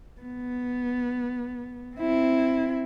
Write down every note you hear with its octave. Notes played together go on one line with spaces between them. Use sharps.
B3
C4 E4